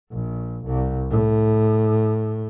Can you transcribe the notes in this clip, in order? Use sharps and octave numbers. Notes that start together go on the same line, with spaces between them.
A#1
C2
A2